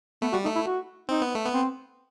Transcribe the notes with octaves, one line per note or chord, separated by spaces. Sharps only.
A3 B3
G3 F#4
A3 D#4
E4
F#4
C4 D#4
B3
A3
B3
C4